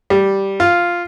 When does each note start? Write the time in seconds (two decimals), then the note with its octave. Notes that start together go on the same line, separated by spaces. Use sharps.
0.10 G3
0.60 F4